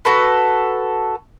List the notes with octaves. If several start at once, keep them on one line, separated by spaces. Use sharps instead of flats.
F#4 A4 B4